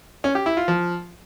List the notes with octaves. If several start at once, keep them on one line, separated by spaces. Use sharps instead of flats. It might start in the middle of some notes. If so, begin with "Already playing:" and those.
C#4
G4
E4
F4
F3